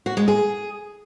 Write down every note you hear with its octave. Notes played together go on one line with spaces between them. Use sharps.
F#4
G#3
G#4